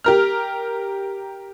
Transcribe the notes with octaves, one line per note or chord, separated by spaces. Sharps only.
G4 A#4 F6